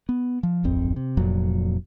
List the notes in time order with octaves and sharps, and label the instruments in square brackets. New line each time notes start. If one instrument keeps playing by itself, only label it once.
[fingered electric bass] B3
F3
D1 G#1 F2 C4
C3
F1 F2 A#2 F#3